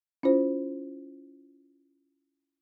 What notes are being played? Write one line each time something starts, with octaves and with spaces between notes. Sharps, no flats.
C#4 E4 F4 C5